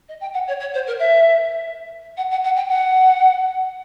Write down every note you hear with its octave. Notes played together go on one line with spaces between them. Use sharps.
D#5
G5
F#5
C#5
C#5
C5
A#4
E5
F#5
F#5
F#5
G5
F#5